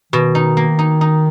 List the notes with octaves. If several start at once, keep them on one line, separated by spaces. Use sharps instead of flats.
B2 D#3
D#4
A#3
D#4
D#4